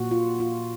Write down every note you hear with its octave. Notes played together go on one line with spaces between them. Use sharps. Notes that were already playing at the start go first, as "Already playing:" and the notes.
Already playing: A#2 F#4
F4
F4